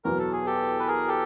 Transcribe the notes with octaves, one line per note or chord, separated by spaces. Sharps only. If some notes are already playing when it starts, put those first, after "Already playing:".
E2 B2 F#3 A#4
A4
G#4
G4 A4
B4
G#4 A#4
G4 A4